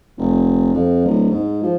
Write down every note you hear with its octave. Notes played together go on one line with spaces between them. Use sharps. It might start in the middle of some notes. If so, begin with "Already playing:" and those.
F1
F2
D1
G#2
F3